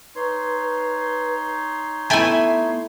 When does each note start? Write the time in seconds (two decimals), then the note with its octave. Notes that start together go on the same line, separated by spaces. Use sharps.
0.16 D#4 B4 C#5 C6
2.10 A3 B3 E4 G5 G#5